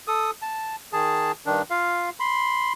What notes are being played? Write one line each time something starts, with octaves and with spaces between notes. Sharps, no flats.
A4 D#6
A5
D#3 G#4 A5
G2 D#3 D4
F4 F5
B5 C6